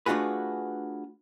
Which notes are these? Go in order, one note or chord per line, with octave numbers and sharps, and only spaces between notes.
A3 D4 F4 F#4 G#4 B4